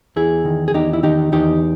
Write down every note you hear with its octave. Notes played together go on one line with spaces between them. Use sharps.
E2 E4 G#4
D#3
G#4
E2 D#4 G4
E4
D#3 D#4 G4
E2 D#4 G4